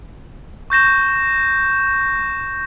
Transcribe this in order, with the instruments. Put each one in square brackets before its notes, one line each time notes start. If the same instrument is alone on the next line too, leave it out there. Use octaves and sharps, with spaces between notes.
[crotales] C#6 G6 A#6 E7